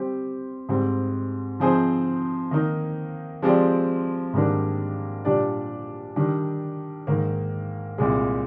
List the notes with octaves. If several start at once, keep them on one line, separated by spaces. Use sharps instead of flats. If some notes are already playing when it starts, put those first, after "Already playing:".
Already playing: G3 C4 G4 C5
G#2 G3 C4
F3 C4 D#4 G#4 C5
D#3 A#3 D#4
F3 G#3 C4 G4 D5
G#2 D#3 G3 A#3 D4
A#2 G3 D4 G4 D5
D#3 G3 D4
G#2 D#3 A#3
C2 A#2 G#3